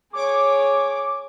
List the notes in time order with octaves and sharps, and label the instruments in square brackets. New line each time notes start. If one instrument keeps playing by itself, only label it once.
[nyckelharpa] G#4 C#5 [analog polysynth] D6